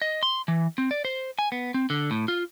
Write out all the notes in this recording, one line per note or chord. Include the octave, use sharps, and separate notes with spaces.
D#5
C6
E3
C4
D5
C5
G#5
B3
C4
D3
A2
F4